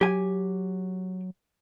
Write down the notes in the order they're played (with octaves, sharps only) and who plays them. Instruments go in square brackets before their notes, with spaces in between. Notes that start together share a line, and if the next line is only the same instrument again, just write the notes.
[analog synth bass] F#3 [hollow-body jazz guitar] G4 G#5